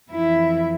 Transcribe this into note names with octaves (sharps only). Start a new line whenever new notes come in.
F2 E3 E4 E5